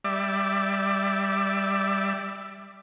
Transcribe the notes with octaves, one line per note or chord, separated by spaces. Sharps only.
G3 D5 E5